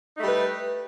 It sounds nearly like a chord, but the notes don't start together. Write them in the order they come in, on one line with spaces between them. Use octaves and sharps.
D#4 A3 G3 B4